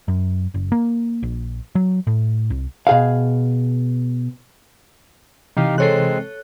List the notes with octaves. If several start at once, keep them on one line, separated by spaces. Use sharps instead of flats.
F#2
F#1
A#3
A#1
F#3
A2
C2
B2 G#4 F5
C3 E3 D#4 G4 F5
G#3 C4 A4 C#5 F#6 C7